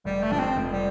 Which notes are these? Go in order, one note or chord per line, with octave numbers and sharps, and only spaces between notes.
F1 G3
A3
F2 F3 D4
C4
F1
G3